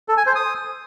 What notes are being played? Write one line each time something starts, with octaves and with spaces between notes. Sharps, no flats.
A4
G#5
C5
D#6